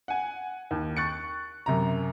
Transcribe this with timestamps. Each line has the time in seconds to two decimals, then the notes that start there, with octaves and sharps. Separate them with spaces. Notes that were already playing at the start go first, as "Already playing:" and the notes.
0.08 F#5 G#5
0.71 D#2
0.97 C#6 F#6 A6 C#7
1.66 F#2 C3 A#5